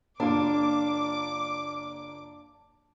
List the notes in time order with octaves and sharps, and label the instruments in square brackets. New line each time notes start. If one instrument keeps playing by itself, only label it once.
[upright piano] F#1 A#3 F4 [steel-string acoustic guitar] D4 [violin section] D6